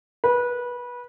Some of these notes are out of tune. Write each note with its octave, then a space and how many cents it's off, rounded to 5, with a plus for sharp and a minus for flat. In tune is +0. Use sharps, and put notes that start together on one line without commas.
B4 -20